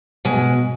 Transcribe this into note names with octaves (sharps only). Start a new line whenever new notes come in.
B2 G#3